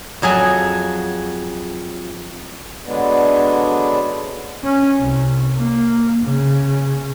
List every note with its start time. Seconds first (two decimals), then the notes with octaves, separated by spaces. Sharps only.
0.22 F2 F#3 G#4 G#5 A5
2.85 D3 F#3 G#3 B3 D4
4.64 C#4
5.00 C2
5.58 A#3
6.25 C#3